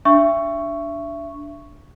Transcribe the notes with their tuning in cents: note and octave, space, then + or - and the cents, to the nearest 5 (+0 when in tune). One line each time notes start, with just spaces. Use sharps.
D4 -5 E5 +25 C#6 +0